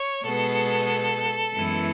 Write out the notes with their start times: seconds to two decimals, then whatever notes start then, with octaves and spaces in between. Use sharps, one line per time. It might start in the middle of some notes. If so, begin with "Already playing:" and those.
Already playing: C#5
0.24 B2 G#3 B3 A4
1.54 F#2 E3 G#3 B3 E4